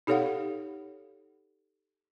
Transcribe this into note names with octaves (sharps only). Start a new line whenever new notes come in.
D#4 G4 A4 C#5 F5 F#5